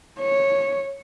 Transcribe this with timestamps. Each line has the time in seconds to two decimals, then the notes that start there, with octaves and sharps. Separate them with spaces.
0.19 C#5